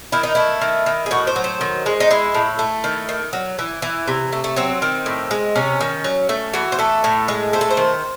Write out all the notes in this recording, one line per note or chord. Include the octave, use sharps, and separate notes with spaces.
D#3 E4
D#4
A3 E4
D#3
D#3
G#4
A2 F#4
C5
F#3
C5
D#3
G#3
D#4
G#3 E4
A2
A3
D#3
D#3
F#3
E3
E3
C3
A3
A3
F#3 C4
D#3
A2
G#3
C3 C#4
D#3
F#3
A3
E3 F#4
C5
A3 A4
A2
G#3
A3 C5
A4
C5
D#3